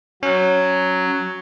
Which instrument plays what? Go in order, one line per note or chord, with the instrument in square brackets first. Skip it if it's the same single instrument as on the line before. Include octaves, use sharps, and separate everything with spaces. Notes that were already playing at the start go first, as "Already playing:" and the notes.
[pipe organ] F#3 [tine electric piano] C#4